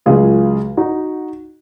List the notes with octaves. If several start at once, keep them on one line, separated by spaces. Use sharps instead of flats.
C#2 C#3 F#3 F4 G#4
D#4 F#4